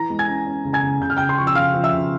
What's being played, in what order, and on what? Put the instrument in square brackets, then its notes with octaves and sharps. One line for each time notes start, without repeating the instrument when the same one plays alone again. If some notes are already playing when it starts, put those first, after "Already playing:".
Already playing: [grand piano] E3 A#5 A#6
G#3
G#5 G#6
C#4
C#4
C#3
G#5 G#6
C#3
C#3 G6
F6
C#3 G5 G6
C6
F3 C#6
E6
C#3 F5 F6
F3
E5 E6
C#3